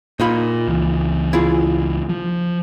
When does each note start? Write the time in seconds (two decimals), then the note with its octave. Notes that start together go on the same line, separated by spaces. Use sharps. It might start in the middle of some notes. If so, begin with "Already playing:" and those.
0.20 A#2 D#4 F4 B5
0.68 C#2 E3
1.33 E4 F4 G#4
2.09 F3